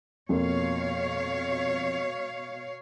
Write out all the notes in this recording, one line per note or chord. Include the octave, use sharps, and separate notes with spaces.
F2 B2 A#3 C#5 F5